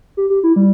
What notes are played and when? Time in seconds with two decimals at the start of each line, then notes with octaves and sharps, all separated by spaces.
0.17 G4
0.30 G4
0.43 E4
0.56 G3